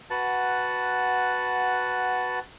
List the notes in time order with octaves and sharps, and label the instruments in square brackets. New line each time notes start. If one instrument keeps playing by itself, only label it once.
[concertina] F#4 B4 F#5 A5